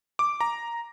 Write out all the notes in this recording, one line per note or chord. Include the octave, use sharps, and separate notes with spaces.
D6
A#5